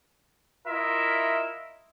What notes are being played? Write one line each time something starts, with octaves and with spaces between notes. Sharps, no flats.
E4 F4 A#4 D#5 E5